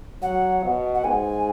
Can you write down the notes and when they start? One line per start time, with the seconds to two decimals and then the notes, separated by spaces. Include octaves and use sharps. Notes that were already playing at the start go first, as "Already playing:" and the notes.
0.22 F#3 F#5
0.64 B2
0.95 F#5
1.04 G#2 G#5